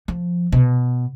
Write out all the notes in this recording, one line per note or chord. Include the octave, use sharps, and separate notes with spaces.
F3
B2